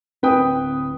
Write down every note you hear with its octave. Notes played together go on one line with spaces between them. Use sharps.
D1 C4 B4 G5 D#6